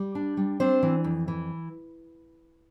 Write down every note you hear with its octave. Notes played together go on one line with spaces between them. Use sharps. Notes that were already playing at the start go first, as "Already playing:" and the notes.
Already playing: G3
D4
G3
C4 D4 C5
E3
F2
E3